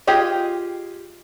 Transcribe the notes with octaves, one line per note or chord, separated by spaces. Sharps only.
F4 G4 G#4 D#5